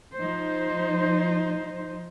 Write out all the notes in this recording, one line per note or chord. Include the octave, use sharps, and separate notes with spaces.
F3 D#4 C5